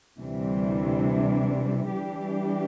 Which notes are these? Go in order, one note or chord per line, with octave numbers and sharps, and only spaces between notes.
D2 C3 E3 G3 D4
E3 G3 D4 G4